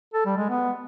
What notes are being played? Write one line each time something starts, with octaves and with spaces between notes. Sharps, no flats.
A4
G3
G#3
B3